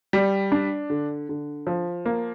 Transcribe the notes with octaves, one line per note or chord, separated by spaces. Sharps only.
G3
D4
D3
D3
F3
A#3